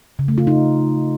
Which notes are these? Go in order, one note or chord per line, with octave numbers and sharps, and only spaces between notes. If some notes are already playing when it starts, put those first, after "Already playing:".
C#3
A3
F4
D#4